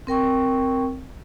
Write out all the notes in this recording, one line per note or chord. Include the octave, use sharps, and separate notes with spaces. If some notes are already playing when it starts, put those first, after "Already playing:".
C4 A#4 G5 C#6